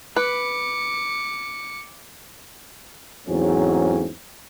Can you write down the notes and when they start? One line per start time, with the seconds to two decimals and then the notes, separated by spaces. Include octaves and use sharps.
0.16 B4 D6 C#7
3.27 E2 G#2 F#3 A3 C4 C#4